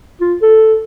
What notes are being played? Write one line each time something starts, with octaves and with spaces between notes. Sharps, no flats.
F4
A4